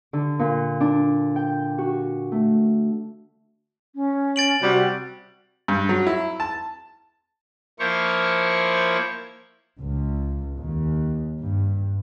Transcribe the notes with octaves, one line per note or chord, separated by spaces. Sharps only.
D3
A#2
D4
G5
F#4
A3
C#4
A6 D7 F#7
C3 G3 F#4
G2
F#3
E4
A5
F3 A#3 E4 C5 C#5 C#6
C#2
D#2
G2